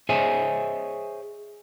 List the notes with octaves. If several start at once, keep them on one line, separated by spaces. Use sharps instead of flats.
G#4 C5 C#5 D#5 E5 G#5